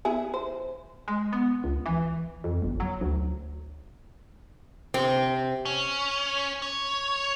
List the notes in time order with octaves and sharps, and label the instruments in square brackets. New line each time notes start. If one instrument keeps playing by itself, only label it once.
[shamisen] B3 E4 G#4
C5
[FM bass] G#3
B3
C#2
E3
F2
G1
F#3
D2
[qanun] C3 [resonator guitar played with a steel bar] C4
[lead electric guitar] C#4
C#5